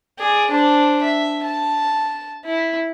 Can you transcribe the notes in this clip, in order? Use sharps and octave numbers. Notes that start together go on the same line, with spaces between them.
G#4 D5
D4 C5
E5
A5
E4